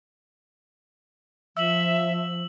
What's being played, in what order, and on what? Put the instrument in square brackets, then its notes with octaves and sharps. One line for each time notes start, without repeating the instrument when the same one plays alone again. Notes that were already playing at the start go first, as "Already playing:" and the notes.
[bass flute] F3 [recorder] E5 [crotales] E6 F#7